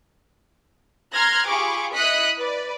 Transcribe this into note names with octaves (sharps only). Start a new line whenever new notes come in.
A#5 C6 F6 F#6 G#6 A#6
F4 G4 G#4 B5 C#6 D6
E4 D#5 D#6 F#6 B6 C#7
B4 D5